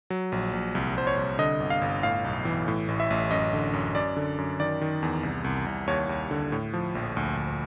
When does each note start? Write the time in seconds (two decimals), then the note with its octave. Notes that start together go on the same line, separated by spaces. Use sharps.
0.10 F#3
0.32 A#1
0.53 A#1
0.75 C2
0.96 C2 C5
1.07 C#5
1.17 C2
1.39 D3 D#5
1.60 G1
1.70 F5
1.82 G1
2.03 A2 F5
2.24 B1
2.45 E3
2.68 A2
2.88 A1
3.00 E5
3.10 A1
3.31 F#2 D#5
3.53 D3
3.73 F#2
3.95 F#2 D5
4.17 D3
4.38 F#2
4.60 D#3 D5
4.81 D#3
5.02 E2
5.23 C2
5.44 C2
5.66 C2
5.87 D#2 C#5
6.09 D#2
6.31 D3
6.52 A2
6.74 F3
6.95 A#1
7.17 D2
7.37 D2